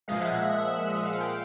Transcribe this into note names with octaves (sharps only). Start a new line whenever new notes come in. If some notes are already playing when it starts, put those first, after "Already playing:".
A#2 F3 G#3 D#5 F5
E5 F#5
E5 F#5
D#5
E5
F5
F#5
F5 G5